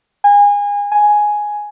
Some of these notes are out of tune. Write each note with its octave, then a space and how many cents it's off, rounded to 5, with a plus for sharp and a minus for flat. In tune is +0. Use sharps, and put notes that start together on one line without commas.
G#5 -30
G#5 +5